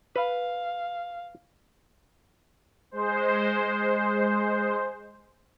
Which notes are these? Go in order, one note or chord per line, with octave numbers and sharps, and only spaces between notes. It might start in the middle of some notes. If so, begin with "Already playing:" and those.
B4 F5
G#3 C5